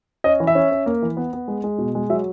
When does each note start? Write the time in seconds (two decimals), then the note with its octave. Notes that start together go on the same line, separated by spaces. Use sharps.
0.24 C#4 D#5
0.40 E3
0.47 E5
0.55 C#4
0.71 C#4
0.86 A#3
1.02 E3
1.17 B3
1.33 B3
1.48 G#3
1.64 G#3
1.78 B2
1.95 G#3
2.10 F#3 E5